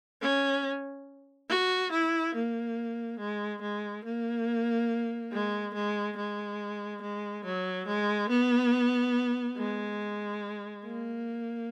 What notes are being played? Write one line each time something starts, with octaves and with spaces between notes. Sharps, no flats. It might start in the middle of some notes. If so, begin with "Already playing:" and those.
C#4
F#4
E4
A#3
G#3
G#3
A#3
G#3
G#3
G#3
G#3
F#3
G#3
B3
G#3
A#3